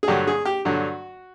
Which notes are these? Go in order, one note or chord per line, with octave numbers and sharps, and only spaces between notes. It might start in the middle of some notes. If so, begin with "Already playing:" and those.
G#4
G2 D3 F#3 G4
G#4
G4
G2 D3 F#3 F#4